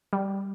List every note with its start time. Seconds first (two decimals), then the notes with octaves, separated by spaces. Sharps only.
0.13 G3